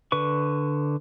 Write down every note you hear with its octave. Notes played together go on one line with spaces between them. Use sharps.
D3 B4 C#6